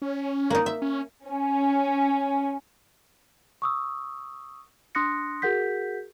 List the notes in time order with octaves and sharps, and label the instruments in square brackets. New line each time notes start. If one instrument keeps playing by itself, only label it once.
[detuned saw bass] C#4
[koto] A#3 D#4
E5
[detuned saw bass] C#4
[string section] C#4
[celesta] C#6 D#6 E6
D4 C6 D#6 F#6 A#6 C#7
F#4 G#4 A#4 F#5 G6 B6